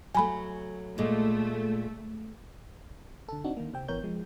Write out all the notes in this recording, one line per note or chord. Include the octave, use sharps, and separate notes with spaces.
F#3 A3 G#5 B5
A#2 G#3 A3
D3 A4
C4 D4 D#4 F#4
D#3 A#3
C3 C4 G5
G#1 E3 B3 A#4 C#5 G6
F3 G#3